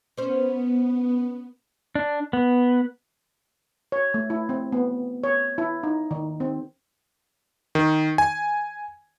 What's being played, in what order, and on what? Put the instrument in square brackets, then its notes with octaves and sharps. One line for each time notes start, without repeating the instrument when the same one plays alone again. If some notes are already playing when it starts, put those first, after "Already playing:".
[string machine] B3 [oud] C#4 C5
[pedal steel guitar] D4
B3
[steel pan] C#5
A3
E4
C4
B3
C#5
E4
D#4
D#3
C4
[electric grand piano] D#3
G#5